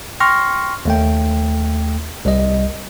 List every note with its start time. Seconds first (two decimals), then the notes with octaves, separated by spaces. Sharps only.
0.20 G5 C6 C#6 F6 A#6
0.85 D#2 A3 G5
2.25 C2 G3 D#5